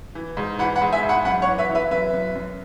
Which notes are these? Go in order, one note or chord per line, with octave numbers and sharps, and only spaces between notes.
E3
G#2
E3 F#5 B5
F#5 B5
G#2
E5 G#5
G#2
F#5 B5
F#2 F#5 B5
C#5 F#5
E3
B4 E5
E3
B4 E5
F#2 B4 E5
F#2
F#2